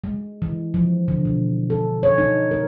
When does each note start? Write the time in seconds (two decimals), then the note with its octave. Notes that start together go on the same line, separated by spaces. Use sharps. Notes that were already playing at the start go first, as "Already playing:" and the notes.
0.04 G#3
0.42 E3
0.74 F3
1.08 D3
1.25 B2
1.70 A4
2.03 C#5
2.18 D#4
2.51 A#4